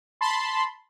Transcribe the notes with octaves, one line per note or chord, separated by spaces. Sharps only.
A5 B5 C6